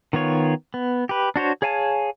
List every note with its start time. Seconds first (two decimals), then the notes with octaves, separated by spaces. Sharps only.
0.13 D#3 B3 F4 C#5
0.74 B3
1.09 G4 B4
1.36 D4 F#4 C5 C#5
1.62 G#4 C#5 F5 G#5 A5